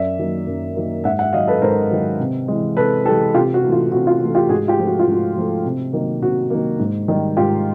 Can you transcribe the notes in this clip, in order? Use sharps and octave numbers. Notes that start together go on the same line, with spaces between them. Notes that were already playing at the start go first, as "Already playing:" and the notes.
Already playing: F#2 D5 E5
D#3 F#3 A#3
F#2
D#3 F#3 A#3
G#2 E5 F#5
E5 F#5
D#3 F#3 D#5 F5
A4 B4
G#2 A#4 C5
D#3 F#3
C3
E3 G#3
C3 A4 B4
E3 G#3 G4 A4
C3 F4 G4
F#4
E3 A3
F4
C3 F#4
F4
E3 A3 F#4
F4 G4
G#2 F#4 G#4
F4 G4
F3 A3
F#4
F4
G#2
F#4
F3 A3
C3
D#3 F#3 A#3
C3 F#4
D#3 F#3 A#3
G#2
D#3 G3
G#2 F4 G4